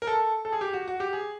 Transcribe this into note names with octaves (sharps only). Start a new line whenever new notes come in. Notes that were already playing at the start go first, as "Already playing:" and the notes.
A#4
A4
A4
G#4
G4
F#4
F#4
G4
G#4